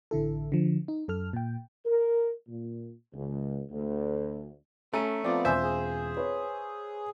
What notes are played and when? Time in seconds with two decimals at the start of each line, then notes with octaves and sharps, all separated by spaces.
0.11 A1 D3 E4 A4
0.52 D3 F3
0.88 D#4
1.08 F#2 A4 F6
1.33 A#2 G5
1.85 A#4
2.48 A#2
3.14 C#2
3.71 D2
4.93 A3 C#4 A#5 D#7
5.24 F3 B3 C4 F4 D5
5.45 E1 C5 E5 G#5 G6
5.63 G#4
6.17 B4 C#5